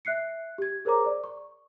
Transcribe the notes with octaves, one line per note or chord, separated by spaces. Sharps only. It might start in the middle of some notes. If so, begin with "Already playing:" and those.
E5 F#6 C7 C#7
G4 G#6
G#4 A#4 C5 C#5 A#5 D6
D5
C#6